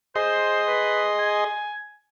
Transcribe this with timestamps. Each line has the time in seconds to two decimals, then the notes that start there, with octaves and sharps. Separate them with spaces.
0.16 G#4 C5 D#5 C6
0.67 B4
1.19 G#5